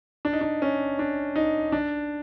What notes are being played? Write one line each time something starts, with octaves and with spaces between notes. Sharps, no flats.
D4
D#4
D4
C#4
D4
D#4
D4